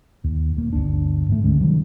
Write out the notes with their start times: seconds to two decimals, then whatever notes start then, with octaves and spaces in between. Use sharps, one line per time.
0.24 D#2
0.55 D#1 A#3
0.73 G1 D2 D4
1.28 G#2 E3 A3
1.44 D2 D3 G#3 C#4
1.61 C3 D#3 F#3 G3